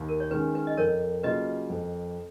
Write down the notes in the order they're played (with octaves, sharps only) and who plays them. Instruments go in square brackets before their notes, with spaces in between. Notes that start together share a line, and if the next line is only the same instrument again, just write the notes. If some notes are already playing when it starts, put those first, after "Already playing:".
Already playing: [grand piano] D#2
[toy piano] A#4
C#5
[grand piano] D#3 G#3 C#4 [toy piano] B4
[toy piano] B4
D#5
[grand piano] F2 [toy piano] A#4 C#5
[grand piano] C#3 F#3 A#3 F4 [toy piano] B4 D#5
[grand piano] F2